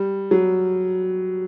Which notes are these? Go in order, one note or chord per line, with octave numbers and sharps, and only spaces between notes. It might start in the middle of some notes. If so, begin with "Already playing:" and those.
Already playing: G3
F#3